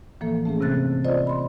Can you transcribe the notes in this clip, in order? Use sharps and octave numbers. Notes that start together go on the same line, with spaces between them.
A2 E3 F3 A#3 A4
A3 C#4 G#4
G2 C3 C4 F#6 A6
F4 C5 D5 D#5
B5 C6